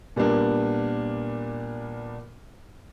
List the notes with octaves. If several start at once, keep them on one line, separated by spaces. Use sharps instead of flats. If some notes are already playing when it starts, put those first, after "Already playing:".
A#2 G3 B3 D4 A#4